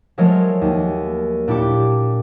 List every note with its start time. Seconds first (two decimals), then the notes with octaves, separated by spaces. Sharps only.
0.18 F3 F#3 G#3 A3 A#4 C#5
0.61 D#2
1.48 A#2 D4 E4 G4 D6 C#7